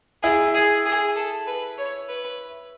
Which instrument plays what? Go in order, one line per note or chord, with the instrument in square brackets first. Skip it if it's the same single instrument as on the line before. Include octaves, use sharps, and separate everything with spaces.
[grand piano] E4 [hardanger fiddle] G#4
[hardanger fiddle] G#4
G#4
A4
B4
C#5
B4